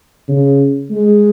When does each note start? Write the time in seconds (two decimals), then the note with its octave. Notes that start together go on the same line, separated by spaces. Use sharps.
0.29 C#3
0.91 G#3